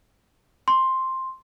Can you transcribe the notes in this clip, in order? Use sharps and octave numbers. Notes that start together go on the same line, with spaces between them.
C6